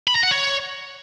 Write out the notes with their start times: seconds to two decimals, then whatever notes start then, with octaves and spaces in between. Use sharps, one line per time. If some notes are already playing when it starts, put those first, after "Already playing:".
0.07 B5
0.15 A#5
0.23 F#5
0.31 C#5